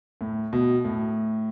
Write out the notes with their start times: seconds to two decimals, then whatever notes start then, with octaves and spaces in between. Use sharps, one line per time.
0.21 A2
0.53 B2
0.85 A2